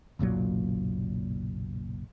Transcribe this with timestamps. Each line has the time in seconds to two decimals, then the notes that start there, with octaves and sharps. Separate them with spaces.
0.19 F#1 B1 A#2 F#3